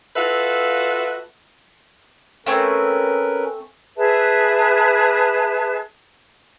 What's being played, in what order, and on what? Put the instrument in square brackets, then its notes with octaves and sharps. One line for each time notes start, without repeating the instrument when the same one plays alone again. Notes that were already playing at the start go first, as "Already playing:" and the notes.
[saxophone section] F4 F#4 A4 B4 E5 F5
[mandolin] A3 C4 G#5 [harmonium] C#4 A#4 B4
[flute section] G#4 B4 E5 A5